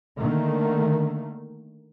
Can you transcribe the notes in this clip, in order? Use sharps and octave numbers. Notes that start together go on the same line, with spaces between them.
D3 D#3 A3 A#3